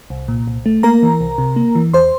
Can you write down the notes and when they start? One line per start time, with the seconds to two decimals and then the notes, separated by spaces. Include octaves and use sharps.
0.10 C2
0.28 A#2
0.47 C2
0.66 A3
0.83 A#3 A#4 A#5
1.02 E3
1.21 C2
1.38 C3
1.56 A#3
1.75 E3
1.93 E2 C5 C6